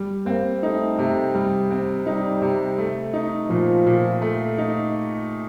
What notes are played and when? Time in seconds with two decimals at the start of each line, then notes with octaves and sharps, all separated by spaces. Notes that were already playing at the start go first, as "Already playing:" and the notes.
Already playing: G3
0.26 A#3 C4
0.63 A3 D#4
0.99 C3
1.35 G3
1.71 C4
2.06 G3 D#4
2.42 C3
2.78 A3
3.13 D#4
3.50 A#2 F3
3.86 A#2
4.22 A3
4.58 D#4